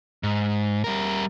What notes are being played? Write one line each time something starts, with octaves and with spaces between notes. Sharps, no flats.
G#2
G3 A#4